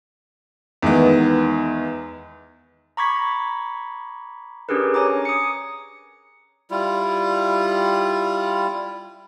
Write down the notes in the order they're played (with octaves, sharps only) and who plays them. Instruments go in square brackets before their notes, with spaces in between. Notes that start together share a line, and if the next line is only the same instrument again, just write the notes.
[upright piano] E2 D#3 G#3 B3
[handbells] A#5 B5 C#6 D6 G#6 B6
C#4 D4 G4 G#4 A#4 B4
C#5 G#5 A#5 D6
D#6 C#7
[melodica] G3 E4 F4